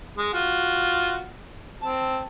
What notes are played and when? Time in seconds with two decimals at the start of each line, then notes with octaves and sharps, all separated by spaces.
0.17 G#3
0.33 F4 F#4
1.82 C4 A5